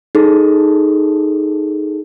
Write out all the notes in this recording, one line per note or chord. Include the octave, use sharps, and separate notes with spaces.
D#4 G#4 A4